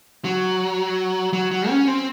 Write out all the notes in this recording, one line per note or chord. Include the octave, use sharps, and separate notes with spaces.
F#3
F#3
F#3
C#4
C4